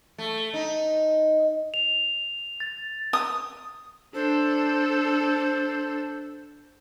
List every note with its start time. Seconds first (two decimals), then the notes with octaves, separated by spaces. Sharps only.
0.18 A3
0.54 D#4
1.74 F7
2.60 A6
3.13 D#6
4.14 D4 A4 C5